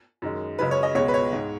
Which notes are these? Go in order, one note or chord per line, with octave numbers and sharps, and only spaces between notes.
F#2 D#3 G#3
F#2 C#3 G#3 B4
C#5
D#5
C#2 B2 G#3 C#5
B4
C#5
G#2 G#3